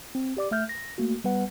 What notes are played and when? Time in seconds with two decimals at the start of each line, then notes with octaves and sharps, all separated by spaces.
0.15 C4
0.37 G4 D5 D6
0.51 A3 E5 F6 G6
0.69 A#6
0.98 A3 A#3 F#4
1.24 G3 B3 B4 F#5